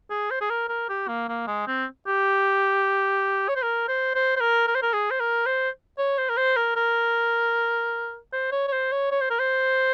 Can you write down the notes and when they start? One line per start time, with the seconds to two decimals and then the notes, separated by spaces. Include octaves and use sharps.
0.10 G#4
0.31 C5
0.41 G#4
0.50 A#4
0.69 A#4
0.89 G4
1.08 A#3
1.29 A#3
1.47 G#3
1.67 C4
2.07 G4
3.48 C#5
3.56 C5
3.63 A#4
3.89 C5
4.15 C5
4.36 C5
4.41 A#4
4.67 A#4
4.75 C5
4.82 A#4
4.93 G#4
5.11 C5
5.20 A#4
5.46 C5
5.98 C#5
6.18 C5
6.29 A#4
6.37 C5
6.56 A#4
6.76 A#4
8.33 C5
8.52 C#5
8.68 C#5
8.72 C5
8.92 C#5
9.11 C#5
9.21 C5
9.30 A#4
9.39 C5